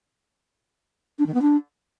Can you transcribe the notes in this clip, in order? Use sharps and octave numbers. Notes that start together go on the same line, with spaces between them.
D4
D#3
B3
D4